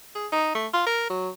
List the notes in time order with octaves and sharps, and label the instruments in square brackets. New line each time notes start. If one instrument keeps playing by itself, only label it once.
[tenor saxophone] G#4
D#4
A3
F4
A#4
F#3